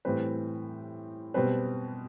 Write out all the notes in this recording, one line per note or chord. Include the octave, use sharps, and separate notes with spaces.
A2 E3 G3 C4 B4
B2 G3 C4 B4